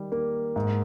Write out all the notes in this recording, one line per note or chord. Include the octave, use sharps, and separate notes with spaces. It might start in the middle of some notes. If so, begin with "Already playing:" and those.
Already playing: D#3 G3
A#3
G#2